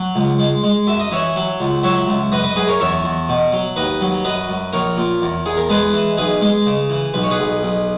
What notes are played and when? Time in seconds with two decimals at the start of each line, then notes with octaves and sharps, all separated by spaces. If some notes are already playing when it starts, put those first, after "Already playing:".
Already playing: F#3
0.16 C#2
0.39 G#3
0.63 G#3
0.87 F#2 E5
0.99 D#5
1.12 E3 C#5 E5
1.36 F#3
1.60 C#2
1.83 F#3 C#5 E5
2.08 C#2
2.32 F#2 B4 D#5
2.44 B4 D#5
2.56 F#2 G#4 B4
2.68 A#4 C#5
2.80 E2 C#5 E5
3.04 E2
3.29 B2
3.52 F#3
3.76 D#2 B4 D#5
4.01 F#3
4.25 F#2 B4 D#5
4.50 F#2
4.73 A#1 A#4 C#5
4.97 A#2
5.22 E2
5.46 E2 G#4
5.57 A#4
5.70 G#3 G#4 B4
5.93 E3
6.18 B1 G#4 B4
6.41 G#3
6.66 C#3
6.90 E3
7.14 B1 B4
7.23 C#5
7.31 G#4 B4
7.39 B1
7.63 B1